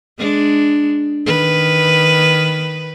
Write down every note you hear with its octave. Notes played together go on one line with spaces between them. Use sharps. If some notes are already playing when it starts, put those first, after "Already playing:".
G#3 D4
D#3 B4